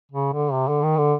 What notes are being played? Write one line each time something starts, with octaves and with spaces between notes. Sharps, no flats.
C#3
D3
C3
D3
D#3
D3